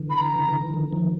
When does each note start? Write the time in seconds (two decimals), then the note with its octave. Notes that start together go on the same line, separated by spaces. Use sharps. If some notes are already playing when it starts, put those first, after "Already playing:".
Already playing: D3 E3
0.10 B5
0.17 A#5
0.36 C#3
0.48 D3
0.62 D#3
0.74 D3 E3
0.93 D#3 F3